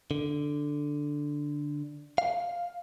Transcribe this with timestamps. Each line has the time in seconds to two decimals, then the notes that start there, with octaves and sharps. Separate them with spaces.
0.11 D3
2.18 F5